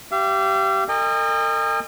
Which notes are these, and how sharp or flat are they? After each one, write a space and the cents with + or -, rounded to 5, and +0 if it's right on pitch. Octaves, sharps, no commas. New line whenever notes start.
G4 -20 F5 -45
A#4 -45 D#5 -20 G5 +45